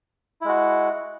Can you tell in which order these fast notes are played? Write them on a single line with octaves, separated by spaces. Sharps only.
E4 G#3 F#4